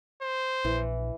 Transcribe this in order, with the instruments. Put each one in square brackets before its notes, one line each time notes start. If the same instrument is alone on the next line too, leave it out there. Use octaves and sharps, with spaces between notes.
[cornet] C5
[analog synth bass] A#1 [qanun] E3